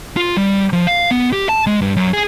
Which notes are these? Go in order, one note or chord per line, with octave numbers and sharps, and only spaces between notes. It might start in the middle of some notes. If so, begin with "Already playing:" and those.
F4
G3
F3
F5
B3
G4
A5
G#3
G2
F#2
G#4